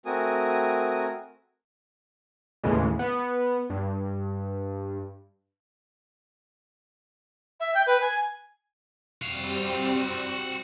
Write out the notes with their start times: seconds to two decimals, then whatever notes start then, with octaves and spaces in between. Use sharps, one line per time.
0.06 A3 C4 F#4 A#4 G#5 D#6
2.64 D#2 A2 C#3 E3 G#3
2.99 B3
3.70 G2
7.60 E5
7.75 G5
7.87 B4
8.01 G#5
9.22 G3 C4 F#4 F5